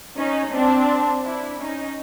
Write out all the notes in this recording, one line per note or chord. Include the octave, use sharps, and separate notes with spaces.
C#4 D#4
C4 D4
D4 E4
C#4 D#4